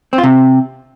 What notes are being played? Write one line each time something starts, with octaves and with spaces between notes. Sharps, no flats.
C4
F4
C3